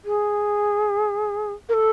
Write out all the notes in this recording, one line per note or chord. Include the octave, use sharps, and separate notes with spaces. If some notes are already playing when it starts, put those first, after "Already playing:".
G#4
A#4
A4